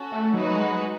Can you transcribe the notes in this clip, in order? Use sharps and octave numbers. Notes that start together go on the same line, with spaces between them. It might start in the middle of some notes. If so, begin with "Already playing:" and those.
Already playing: C#4 F#4 A4
A3
F#3 D#4 F#4 B4
G#3